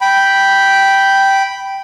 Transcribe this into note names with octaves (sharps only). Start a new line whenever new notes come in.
G5 B5